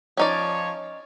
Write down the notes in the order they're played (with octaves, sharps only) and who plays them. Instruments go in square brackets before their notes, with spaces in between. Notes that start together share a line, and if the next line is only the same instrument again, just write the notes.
[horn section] F3 C#5 [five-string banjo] C#4 D#4 D5